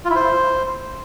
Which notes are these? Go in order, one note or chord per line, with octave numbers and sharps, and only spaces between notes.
F4
E4
C5